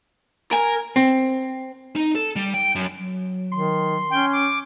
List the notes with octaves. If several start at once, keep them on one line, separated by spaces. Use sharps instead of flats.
A#4 G#5
C4
D#4
A4
G3
G5
F#2
F#3
D#3 C6
C#4 G5
D6